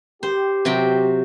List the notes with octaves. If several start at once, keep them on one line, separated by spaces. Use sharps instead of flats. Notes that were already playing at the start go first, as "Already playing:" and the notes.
G4 C5
C3 F#3 G5